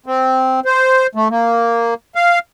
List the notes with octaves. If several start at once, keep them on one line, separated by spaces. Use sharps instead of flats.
C4
C5
A3
A#3
F5